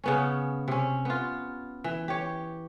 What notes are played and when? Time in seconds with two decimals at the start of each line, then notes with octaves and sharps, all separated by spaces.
0.04 C#3 B3 C#4
0.68 C3 C#4
1.05 B3 F4
1.84 E3
2.08 G4 C#5